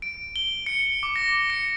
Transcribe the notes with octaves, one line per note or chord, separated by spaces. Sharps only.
D7
G7
C#7
D6
A#6
C#7